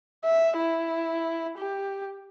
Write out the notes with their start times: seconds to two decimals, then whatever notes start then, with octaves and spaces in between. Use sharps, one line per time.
0.25 E5
0.57 E4
1.58 G4